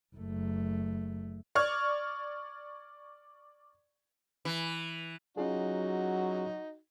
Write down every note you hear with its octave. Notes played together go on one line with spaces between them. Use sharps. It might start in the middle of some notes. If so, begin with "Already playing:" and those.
F#1 A3
D5 C#6 F6 G#6
E3
F#3 C#4 D#4 F4 F#4 G#4